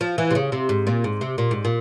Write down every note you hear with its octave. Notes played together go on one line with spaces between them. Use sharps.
F3
E3
C3
C#3
C3
G#2
A#2
G#2
C3
A#2
G#2
A#2